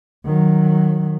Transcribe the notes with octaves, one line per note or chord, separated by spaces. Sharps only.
D#3 F#3